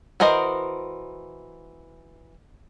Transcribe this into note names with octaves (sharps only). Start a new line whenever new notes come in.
E3 F#4 A#4 C5 D#5